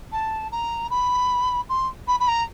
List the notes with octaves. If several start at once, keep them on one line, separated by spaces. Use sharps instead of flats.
A5
A#5
B5
C6
B5
B5
A#5